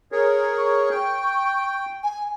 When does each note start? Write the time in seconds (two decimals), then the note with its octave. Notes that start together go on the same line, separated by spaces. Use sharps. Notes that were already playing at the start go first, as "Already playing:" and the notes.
0.12 G#4 A#4 C#5
0.58 C#6
0.90 G5
2.03 G#5